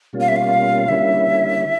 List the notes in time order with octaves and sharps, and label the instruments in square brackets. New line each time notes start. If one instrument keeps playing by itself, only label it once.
[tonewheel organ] B2 G3 A#3 C#4 F4
[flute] F5
E5
F5
[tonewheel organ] D3 G3 A#3 C#4 E4 [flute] E5